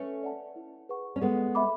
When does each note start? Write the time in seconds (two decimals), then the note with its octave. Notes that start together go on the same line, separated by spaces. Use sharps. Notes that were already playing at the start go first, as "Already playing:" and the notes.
Already playing: A3 C#4 B4
0.23 D5 F#5 A5
0.56 E4
0.89 G#4 B4 F#5 C#6
1.16 C#4
1.21 G#3 B3 A4
1.55 E5 B5 D6